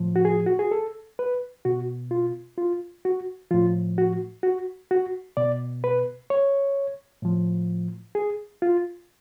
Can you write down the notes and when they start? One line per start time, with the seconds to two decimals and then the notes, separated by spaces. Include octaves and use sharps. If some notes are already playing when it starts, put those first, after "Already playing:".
Already playing: A2 F3
0.16 F#4
0.25 G#4
0.46 F#4
0.59 G#4
0.71 A4
1.19 B4
1.65 B2 F#4
2.11 F4
2.58 F4
3.05 F#4
3.51 A2 F3 F4
3.98 F#4
4.43 F#4
4.91 F#4
5.37 B2 D5
5.84 B4
6.30 C#5
7.22 A2 F3
8.15 G#4
8.62 F4